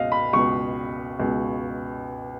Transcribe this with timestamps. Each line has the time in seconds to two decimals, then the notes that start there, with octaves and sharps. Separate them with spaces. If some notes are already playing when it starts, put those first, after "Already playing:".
Already playing: C#2 B2 D#5 F5
0.12 B5
0.33 C#2 B2 C#6
1.20 C#2 B2